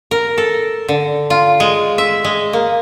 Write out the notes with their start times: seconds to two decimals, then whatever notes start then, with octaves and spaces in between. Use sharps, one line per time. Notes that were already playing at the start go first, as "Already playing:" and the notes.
0.11 A#4
0.38 A4
0.88 D3
1.30 F4
1.60 G#3
1.98 E5
2.24 G#3
2.53 A#3